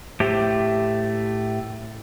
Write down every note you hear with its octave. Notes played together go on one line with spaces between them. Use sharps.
A2 A3 G4 C5